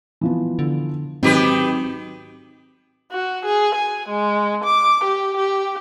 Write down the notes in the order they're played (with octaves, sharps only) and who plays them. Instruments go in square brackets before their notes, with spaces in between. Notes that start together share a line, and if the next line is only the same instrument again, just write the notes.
[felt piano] E3 F3 B3
[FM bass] D3
[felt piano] G#2 F#3 [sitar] D#3 G4 B4 [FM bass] C4
[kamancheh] F#4
G#4
G#5
G#3
D6
G4
G4